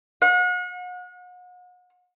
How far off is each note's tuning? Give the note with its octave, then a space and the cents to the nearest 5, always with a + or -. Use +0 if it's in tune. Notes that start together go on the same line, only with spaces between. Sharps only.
F#5 -40